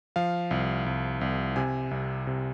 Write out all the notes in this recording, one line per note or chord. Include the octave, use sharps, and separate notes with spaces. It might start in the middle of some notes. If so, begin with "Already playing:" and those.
F3 F5
C2
C2
C2
C3 G#5
C2
C3